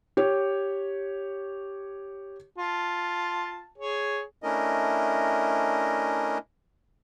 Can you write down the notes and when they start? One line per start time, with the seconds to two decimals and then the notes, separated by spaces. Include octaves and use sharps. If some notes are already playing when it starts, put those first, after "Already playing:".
0.17 G4 C#5
2.59 F4 A5
3.78 G#4 C#5
4.43 A3 C#4 D4 E4 A#4 D#5